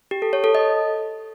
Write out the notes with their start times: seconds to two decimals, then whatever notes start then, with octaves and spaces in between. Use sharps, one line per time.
0.11 G4
0.22 A4
0.33 C#5
0.44 A4
0.55 D#5